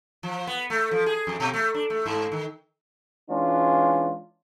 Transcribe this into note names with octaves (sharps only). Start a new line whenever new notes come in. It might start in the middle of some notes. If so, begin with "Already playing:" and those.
F3
B3
A3
F3
G#4
F2
B2
A3
D4
A3
G#2
D#3
E3 G#3 C#4 D4 F4